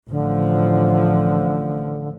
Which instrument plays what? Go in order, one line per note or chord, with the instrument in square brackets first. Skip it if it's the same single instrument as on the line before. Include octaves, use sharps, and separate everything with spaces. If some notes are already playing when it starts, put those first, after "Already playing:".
[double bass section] A1 F3 [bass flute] D3